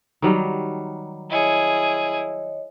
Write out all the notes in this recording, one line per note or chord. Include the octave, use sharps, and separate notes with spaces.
D#3 F#3 G3
E4 G#4 C#5 D#5